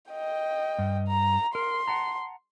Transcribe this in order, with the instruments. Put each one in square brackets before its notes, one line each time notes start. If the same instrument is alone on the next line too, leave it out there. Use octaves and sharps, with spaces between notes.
[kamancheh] D#5 G5
[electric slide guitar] G2
[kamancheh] A#5
[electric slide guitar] A#4 [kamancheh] C6
[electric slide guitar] F#5 A5 A#5